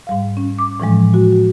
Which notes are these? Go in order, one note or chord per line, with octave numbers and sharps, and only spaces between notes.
G#2 G3 F5
C#4
D6
A2 E3 F3 G#3
F#4
F#4